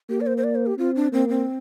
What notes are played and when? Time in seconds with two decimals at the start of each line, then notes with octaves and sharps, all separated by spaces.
0.10 A#3 G4
0.21 D5
0.27 C5
0.37 C5
0.44 D5
0.55 C5
0.66 G4
0.78 C4 F4
0.96 D4
1.12 A#3 C4
1.29 C4